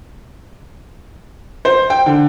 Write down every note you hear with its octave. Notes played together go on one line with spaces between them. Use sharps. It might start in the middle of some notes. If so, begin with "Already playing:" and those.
C5
G5
D3